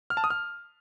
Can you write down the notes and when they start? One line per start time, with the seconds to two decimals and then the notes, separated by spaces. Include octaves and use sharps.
0.10 F6
0.17 A5
0.24 D#6
0.30 F6